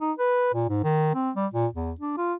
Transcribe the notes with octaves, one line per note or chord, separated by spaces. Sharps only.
D#4
B4
A#2
G#2
D#3
C4
G3
A#2
E2
D4
F4